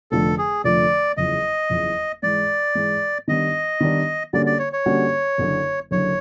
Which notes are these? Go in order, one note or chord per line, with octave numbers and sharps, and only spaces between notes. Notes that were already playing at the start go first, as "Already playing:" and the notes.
F1 F2 D3 F3 A3 A4
G#4
F1 F2 D3 F3 A3 D5
F#1 E2 C#3 F3 D#5
F#1 E2 C#3 F3
G#2 E3 G#3 D5
G#2 E3 G#3
D#3 G3 B3 D4 D#5
D#3 G3 B3 D4
D3 G3 A#3 C#4 F#4 D5
D5
C#5
C#5
D3 G3 A#3 C#4 F#4
F#1 F#2 D3
F#1 F#2 D3 C#5